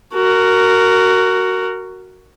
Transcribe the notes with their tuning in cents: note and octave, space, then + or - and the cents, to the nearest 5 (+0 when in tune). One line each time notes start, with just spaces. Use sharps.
F#4 +10 A#4 -10